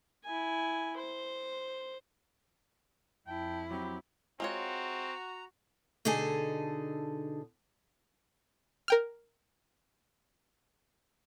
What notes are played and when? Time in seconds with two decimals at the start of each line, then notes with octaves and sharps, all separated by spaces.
0.24 E4 G#5
0.97 C5
3.27 F2 E4 G5 A5
3.71 F#3 C4 G4 B5
4.40 G#3 C4 F4 F#4 C#5 A#5
6.05 B2 D3 D#4 G#4 A4 A5
8.88 A#4 G5 F6